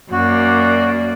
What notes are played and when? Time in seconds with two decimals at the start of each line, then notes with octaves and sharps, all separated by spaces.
0.12 F#2 A#3 F#4 D5